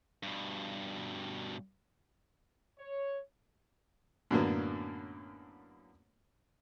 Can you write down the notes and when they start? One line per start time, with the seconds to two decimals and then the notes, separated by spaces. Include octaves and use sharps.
0.23 G2 B2
2.79 C#5
4.31 F#2 A2 D3 F#3 A#3 B3